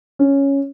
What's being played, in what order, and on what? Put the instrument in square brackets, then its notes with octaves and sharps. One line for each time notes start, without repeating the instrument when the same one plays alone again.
[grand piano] C#4